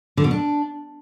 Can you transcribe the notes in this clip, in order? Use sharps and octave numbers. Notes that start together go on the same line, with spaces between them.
D3
B2
D4